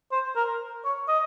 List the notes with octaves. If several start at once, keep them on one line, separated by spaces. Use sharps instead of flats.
C5
A#4
C#5
D#5